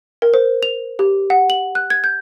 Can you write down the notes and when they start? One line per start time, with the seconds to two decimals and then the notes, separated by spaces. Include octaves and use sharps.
0.22 A#4
0.34 C5
0.63 F7
0.99 G4
1.30 F#5
1.50 F#7
1.75 F#6
1.90 G#6
2.04 G6